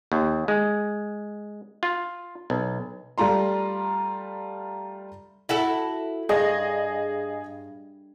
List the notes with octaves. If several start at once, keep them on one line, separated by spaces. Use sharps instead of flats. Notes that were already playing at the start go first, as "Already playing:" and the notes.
D#2
G#3
F4
B1
G3 A3 F4 A#5 C6
E4 F#4 A4
G2 G#4 D#5